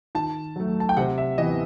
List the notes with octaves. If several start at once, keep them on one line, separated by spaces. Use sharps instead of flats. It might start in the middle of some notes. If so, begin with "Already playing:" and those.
D#3 A5
F#3 A3
A5
G5
C3 F#5
E5
E3 B3 D#5